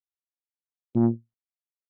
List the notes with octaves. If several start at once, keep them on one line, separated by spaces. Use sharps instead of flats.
A#2